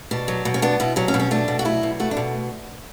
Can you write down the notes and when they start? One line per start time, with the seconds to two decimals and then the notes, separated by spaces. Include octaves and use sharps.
0.11 B2 D4
0.28 F#3
0.45 B2
0.54 C#4
0.62 B3 D4
0.80 B2 E4
0.96 F#3 C#4
1.08 C#4
1.14 B2
1.20 C#4
1.31 A3 D4
1.48 B2
1.59 F#4
1.65 F#3 E4
1.83 B2
2.00 A3 F#4
2.11 D4
2.17 B2